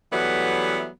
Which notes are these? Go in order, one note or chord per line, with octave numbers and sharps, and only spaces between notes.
E3 F#3 G3 A3 B3